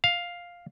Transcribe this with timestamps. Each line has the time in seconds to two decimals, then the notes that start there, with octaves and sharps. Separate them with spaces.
0.04 F5